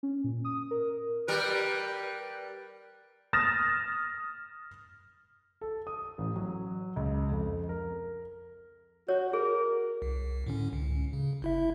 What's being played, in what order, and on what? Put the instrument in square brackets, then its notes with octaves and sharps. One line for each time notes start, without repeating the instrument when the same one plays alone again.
[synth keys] C#4
A#2
D#6
A#4
[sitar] G3 A#4 [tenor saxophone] B4
[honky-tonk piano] D#6 F6 A6 A#6 E7
[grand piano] A4
D#6
A1
F#3
C#2
F2
A#4
[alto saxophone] F#4 [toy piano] C#5
[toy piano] G#4 [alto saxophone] A#4
[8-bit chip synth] C2
A2 D3 C#4
C#2
C#3
G1 E4 E5